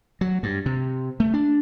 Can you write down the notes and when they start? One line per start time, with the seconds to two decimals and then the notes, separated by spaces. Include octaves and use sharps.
0.21 F#3
0.43 G2
0.66 C3
1.20 A3
1.34 D4